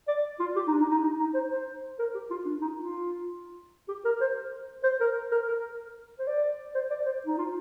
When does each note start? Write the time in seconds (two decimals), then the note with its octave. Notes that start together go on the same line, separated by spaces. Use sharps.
0.08 D5
0.40 F4
0.56 G4
0.67 D#4
0.73 D4
0.80 D#4
0.91 D#4
1.03 D#4
1.19 D#4
1.34 C5
1.51 C5
1.99 A#4
2.15 G4
2.30 F4
2.46 D4
2.61 D#4
2.78 F4
3.88 G4
4.05 A#4
4.21 C5
4.84 C5
5.00 A#4
5.32 A#4
5.48 A#4
6.19 C5
6.27 D5
6.75 C5
6.90 D5
7.06 C5
7.26 D#4
7.38 F4